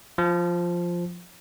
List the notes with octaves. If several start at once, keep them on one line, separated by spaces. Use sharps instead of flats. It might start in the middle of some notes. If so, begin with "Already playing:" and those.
F3